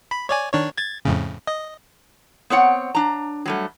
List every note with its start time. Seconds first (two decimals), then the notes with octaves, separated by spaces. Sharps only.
0.11 B5
0.29 C#5 D5 G#5
0.54 D#3 D4 C#5
0.78 G#6 A6
1.05 F2 A2 C#3
1.47 D#5
2.50 B3 C4 C#5 F#5
2.95 D4 A#5
3.46 F#3 G3 A3